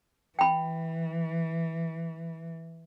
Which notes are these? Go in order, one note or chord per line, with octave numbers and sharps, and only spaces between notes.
E3 G5 B5